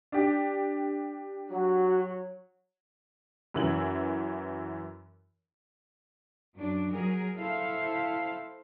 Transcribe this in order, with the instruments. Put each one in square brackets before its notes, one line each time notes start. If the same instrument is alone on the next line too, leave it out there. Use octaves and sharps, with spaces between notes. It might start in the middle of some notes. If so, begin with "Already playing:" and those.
[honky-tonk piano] D4 G4
[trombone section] F#3 [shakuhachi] F#4
[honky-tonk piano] F#2 E3 F#7
[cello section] F#2 F#3 D4
F#3 G#4 A#4
E4 A4 C5 E5 F5